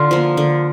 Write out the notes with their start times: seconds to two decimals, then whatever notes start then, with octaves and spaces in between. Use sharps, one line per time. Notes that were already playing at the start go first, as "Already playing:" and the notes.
Already playing: D3 F4
0.11 F3 A#3
0.37 D3